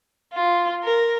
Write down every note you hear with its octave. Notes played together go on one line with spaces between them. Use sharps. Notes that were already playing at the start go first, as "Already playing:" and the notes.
F4
A#4